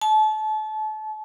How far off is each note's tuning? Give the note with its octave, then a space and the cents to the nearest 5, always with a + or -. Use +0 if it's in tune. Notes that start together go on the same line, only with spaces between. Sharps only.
A5 -30